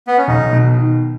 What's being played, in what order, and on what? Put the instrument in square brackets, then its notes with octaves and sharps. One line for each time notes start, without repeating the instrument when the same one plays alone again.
[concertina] B3
C#4
[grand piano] B1 [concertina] D#4
[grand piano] B2
D#3